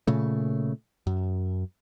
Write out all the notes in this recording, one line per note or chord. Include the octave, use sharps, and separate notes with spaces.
A#2 C#3 A3
F#2